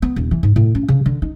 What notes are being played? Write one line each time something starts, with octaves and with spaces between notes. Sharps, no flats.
B3
D#1
E3
G#2
A2
C#4
C#3
D3
D#4